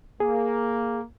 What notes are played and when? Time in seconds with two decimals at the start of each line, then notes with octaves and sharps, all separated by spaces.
0.20 A#3 G#4